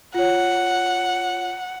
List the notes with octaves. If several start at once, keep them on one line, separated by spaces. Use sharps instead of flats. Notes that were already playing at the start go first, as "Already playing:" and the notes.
F4 C#5 F#5